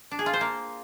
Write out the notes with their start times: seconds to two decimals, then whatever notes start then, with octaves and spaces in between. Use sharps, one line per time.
0.11 D4
0.19 G#4
0.26 F4
0.33 C5
0.41 A#3